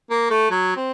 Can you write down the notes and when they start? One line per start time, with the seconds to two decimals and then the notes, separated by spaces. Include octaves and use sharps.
0.10 A#3
0.31 A3
0.51 F#3
0.76 C4